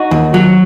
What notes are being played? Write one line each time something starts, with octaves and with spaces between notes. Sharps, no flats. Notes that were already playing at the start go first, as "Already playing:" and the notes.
Already playing: D#4 F#4
D#2
F#3